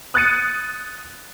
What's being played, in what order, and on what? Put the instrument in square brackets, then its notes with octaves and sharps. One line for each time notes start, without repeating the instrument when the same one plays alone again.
[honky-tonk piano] D#6 F#6 G#6 A6 C#7 D#7